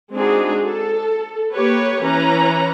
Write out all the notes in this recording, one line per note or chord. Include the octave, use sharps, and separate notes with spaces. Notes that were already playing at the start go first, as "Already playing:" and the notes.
G#3 C4 D4 D#4 F#4 G#4
A4
A#3 G4 B4 C#5
E3 C#4 B4 A#5